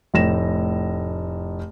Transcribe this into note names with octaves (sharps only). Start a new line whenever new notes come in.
F1 A2 A#6 E7